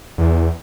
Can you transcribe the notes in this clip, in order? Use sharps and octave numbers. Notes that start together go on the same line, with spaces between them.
E2